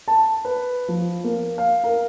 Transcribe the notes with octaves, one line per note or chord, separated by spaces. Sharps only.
A5
B4
F3
A#3
F5
A#4